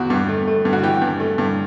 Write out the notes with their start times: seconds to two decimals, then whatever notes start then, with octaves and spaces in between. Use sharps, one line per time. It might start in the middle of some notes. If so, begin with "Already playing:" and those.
Already playing: E2 F#4
0.10 G2
0.29 A3
0.48 A3
0.65 G2
0.73 F#4
0.83 E3 G4
1.02 G2
1.20 A3
1.38 G2